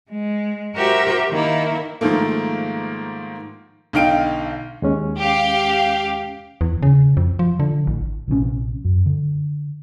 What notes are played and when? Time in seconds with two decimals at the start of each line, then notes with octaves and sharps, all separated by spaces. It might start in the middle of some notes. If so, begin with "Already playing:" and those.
0.10 G#3
0.75 F#4 G4 A#4 C5 E5 G5
1.30 D#3 A#3 E4
2.01 G#2 D#3 F3 A3 A#3
3.93 B1 D3 D#4 F5 G5 D7
4.82 D#2 G#3 C#4
5.18 G4 F5
6.61 E2
6.83 C#3
7.17 F2
7.39 F3
7.60 D3
7.87 A1
8.28 A#1 C3 D#3 C#4
8.85 F#2
9.06 D3